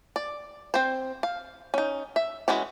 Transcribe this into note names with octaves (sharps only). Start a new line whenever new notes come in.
D5
C4 C5
F5
C#4 D#4
E5
E3 G#3 C#4 F#4